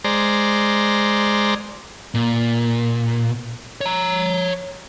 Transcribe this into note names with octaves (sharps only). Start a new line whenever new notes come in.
G#3 C5 D5 A#5
A#2
C#5 A#5